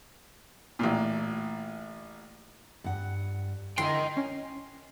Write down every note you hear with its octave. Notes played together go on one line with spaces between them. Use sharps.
A1 A#2
G2 F#5
D3 E4 A#4 D#5 G5 C6
C#4